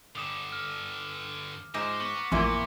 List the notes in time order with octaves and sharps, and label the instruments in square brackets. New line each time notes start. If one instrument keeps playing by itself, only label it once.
[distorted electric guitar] G2 D3 [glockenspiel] D6 D#6 E7
[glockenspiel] F6
[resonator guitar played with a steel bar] G#2 [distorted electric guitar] F3 C5 [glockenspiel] D6 A#6 E7
[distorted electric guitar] B3 [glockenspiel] C#6 F#7
[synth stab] A1 F2 [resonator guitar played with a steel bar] A#2 E3 A#3 [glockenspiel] C6 D6